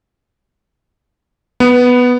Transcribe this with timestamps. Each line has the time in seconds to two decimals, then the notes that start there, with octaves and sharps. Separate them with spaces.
1.60 B3